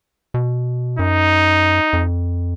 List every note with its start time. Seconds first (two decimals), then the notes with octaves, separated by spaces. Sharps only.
0.34 B2
0.99 F#2 D#4
1.93 F2